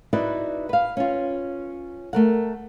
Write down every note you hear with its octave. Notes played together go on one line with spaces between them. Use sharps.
D#4 E4 F#4 B4 D5
B4 F5
C#4 F4
A3 A#4 F#5